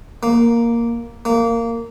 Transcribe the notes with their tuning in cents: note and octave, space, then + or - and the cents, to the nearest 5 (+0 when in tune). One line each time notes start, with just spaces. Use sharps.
A#3 +0
A#3 -15